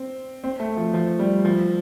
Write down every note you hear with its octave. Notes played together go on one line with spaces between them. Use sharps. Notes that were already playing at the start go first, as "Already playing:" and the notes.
Already playing: C4
C4
A3
F3
F3
G3
F3